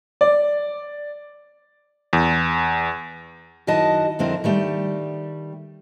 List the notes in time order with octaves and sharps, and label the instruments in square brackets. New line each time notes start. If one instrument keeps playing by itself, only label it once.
[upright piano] D5
[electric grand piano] E2
[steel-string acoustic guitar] F#2 D#3 E4 F#4 D#5 A5
F2 D3 C4 E4 A#4
D#3 G3 A3 G5